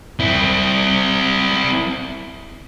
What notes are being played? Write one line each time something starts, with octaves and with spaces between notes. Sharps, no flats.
C4 E4